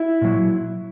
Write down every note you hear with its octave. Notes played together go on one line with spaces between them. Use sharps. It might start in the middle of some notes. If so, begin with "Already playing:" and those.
Already playing: E4
A#2 F#3